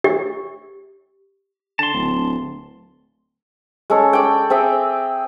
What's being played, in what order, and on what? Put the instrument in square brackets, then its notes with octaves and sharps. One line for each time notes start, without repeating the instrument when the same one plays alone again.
[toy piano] G4
[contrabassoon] D3 [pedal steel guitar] A5 C6
[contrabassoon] D1
[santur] G#3 C#4 A4 C#5
A4 D5 G5
C4 G#4 E5 G5